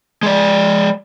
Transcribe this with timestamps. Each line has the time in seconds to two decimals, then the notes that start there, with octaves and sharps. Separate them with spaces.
0.23 G#3 D5